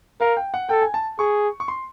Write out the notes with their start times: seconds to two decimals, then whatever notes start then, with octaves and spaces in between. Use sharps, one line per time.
0.21 A#4 F5
0.37 G5
0.54 F#5
0.69 A4 G5
0.82 G#5
0.94 A5
1.19 G#4 C#6
1.60 C#6
1.68 C6